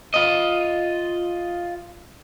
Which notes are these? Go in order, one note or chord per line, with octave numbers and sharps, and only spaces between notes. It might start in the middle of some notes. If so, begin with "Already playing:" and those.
F4 D#5